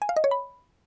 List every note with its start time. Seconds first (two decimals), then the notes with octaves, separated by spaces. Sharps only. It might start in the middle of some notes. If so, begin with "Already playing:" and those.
0.02 G#5
0.09 F5
0.16 D#5
0.24 C#5
0.31 B5